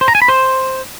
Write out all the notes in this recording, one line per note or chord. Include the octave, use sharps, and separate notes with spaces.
C5
A#5
G#5
B5
C5